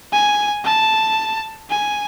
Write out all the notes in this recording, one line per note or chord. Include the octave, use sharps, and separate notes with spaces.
G#5
A5
G#5